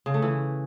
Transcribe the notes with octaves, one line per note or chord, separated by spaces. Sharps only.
C#3
A3
E3